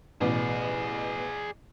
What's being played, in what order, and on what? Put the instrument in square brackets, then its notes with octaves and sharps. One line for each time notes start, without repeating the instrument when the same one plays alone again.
[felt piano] A1 B2 [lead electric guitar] G#4 D5